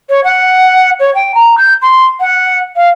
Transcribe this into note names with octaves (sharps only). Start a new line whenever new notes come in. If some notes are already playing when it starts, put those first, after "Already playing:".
C#5
F#5
C#5
G5
A#5
G6
C6
F#5
F5